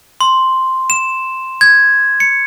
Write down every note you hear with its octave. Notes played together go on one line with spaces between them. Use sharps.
C6
E7
G#6
C#7